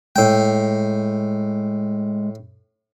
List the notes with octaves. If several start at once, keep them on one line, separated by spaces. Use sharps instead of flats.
A2 G#3 G5